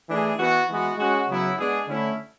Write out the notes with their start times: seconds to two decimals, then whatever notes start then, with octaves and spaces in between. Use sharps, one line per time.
0.09 E3 A3 D4 G#4
0.39 E3 B3 F#4
0.69 E3 G#3 B3 F#4
0.98 G#3 C#4 F#4
1.28 C#3 F#3 B3 E4
1.57 G#3 B3 D4 G#4
1.87 D3 A3 C#4 E4